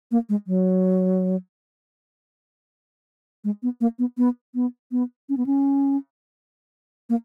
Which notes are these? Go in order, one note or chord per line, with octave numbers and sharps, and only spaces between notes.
A#3
G#3
F#3
G#3
B3
A#3
B3
B3
B3
B3
C#4
B3
C#4
A#3